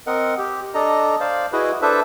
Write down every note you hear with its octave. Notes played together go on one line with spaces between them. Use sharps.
C4 A#4 D#5 F#5
G4
D4 A4 D#5 A#5
C5 D5 F5
E4 F#4 G#4 B4 D#5
D4 A4 B4 C5 E5